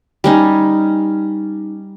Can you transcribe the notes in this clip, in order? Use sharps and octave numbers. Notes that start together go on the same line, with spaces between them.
G3 C#4 D#4